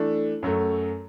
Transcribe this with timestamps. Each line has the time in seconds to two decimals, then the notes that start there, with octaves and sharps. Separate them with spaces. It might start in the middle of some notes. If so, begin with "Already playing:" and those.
Already playing: E3 A3 D4
0.43 F#2 F#3 A3